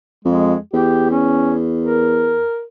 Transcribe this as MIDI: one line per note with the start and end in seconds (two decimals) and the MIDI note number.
0.25 0.55 41
0.25 0.59 56
0.74 2.44 40
0.74 1.09 67
1.10 1.55 61
1.81 2.64 70